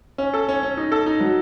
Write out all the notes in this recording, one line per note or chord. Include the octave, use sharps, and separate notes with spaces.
C#4
A4
C#4
C#4
D#4
A4
D#4
F#3